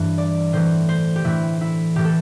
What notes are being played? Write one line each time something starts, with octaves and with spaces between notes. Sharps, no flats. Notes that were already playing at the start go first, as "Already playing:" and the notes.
Already playing: G2 E3
D5
A2 E3 C5
C5
G4
A2 E3 E4
E4
A2 E3 G4
A4